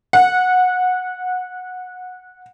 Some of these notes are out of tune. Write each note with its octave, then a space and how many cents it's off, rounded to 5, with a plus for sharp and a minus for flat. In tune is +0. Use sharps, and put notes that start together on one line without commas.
F#5 -20